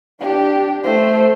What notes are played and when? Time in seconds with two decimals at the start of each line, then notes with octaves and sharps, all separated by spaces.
0.20 D4 G4
0.83 A3 C5